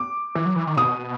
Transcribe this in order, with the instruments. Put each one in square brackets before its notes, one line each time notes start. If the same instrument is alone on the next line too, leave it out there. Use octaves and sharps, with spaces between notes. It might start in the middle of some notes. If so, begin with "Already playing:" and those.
Already playing: [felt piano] D6
[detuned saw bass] E3
F#3
E3
D#3
[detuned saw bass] B2 [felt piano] D#6